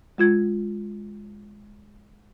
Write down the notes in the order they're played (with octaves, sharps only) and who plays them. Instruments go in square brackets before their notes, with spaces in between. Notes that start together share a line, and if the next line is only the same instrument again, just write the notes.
[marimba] G#3 F4 G#6